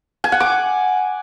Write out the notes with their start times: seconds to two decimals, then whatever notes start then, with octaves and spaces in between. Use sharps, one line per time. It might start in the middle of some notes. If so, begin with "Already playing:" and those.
0.24 G#5
0.32 F#5
0.40 D6